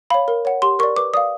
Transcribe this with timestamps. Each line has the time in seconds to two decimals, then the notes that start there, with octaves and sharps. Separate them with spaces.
0.10 C#5 F5 B5
0.28 A#4
0.45 C#5 F#5
0.62 G4 C6
0.79 A#4 C#6
0.83 D5
0.96 B4 D6
1.14 D5 F5 D#6